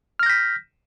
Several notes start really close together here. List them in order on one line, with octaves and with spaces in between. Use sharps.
F6 A#6 G6 B6